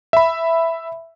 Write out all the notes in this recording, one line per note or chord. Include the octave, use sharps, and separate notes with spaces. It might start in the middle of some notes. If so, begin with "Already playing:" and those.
E5 B5